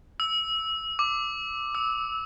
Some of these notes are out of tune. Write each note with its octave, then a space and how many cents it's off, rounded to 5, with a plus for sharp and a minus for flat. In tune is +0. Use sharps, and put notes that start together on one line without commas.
E6 -10
D6 +10
E6 -20